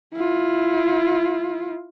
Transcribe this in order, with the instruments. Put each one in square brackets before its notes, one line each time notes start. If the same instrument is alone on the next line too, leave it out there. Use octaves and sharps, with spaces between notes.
[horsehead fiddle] E4 F4